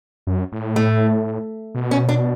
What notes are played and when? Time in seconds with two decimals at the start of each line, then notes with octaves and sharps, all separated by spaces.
0.27 F#2
0.52 A2
0.76 A3
1.75 B2
1.91 C#4
2.09 D4